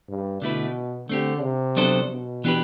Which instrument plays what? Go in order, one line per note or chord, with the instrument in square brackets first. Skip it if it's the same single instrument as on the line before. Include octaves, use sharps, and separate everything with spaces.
[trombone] G2
[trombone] B2 [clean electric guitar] D3 A3 E4 B4
[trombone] D3 [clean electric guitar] A3 C4 G4
[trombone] C3
[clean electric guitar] F#3 B3 D4 A4 C5
[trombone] B2
[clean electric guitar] E3 B3 D4 G4 B4